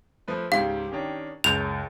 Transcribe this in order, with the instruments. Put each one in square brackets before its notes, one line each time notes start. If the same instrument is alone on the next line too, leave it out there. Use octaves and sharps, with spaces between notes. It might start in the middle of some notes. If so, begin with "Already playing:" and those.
[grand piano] F3 A3 B4
[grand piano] C#2 G#2 [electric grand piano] G4 [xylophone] F5
[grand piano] D#3 C#4 D4
[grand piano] F#1 G6 [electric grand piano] C#2 [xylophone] F7